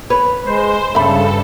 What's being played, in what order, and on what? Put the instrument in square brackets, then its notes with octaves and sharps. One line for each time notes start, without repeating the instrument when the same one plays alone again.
[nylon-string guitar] B4 [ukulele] C#5
[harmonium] G#3 [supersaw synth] C5
[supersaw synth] G2 A4 [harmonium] C#3 [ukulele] E5 B5